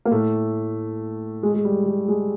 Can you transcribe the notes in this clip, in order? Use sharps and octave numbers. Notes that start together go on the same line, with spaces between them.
A#3
A2 A3
G#3
G#3
G3
G#3
G#3